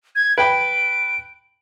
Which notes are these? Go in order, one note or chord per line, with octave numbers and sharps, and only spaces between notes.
G#6
B4 G5 B5 D7